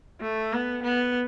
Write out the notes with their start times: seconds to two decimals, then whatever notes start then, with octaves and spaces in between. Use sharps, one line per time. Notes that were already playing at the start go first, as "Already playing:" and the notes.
0.22 A3
0.53 B3
0.83 B3